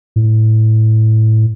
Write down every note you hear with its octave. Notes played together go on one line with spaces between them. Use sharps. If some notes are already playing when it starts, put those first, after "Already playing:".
A2